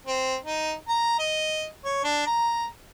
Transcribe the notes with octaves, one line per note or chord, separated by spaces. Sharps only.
C4
D#4
A#5
D#5
C#5
D4
A#5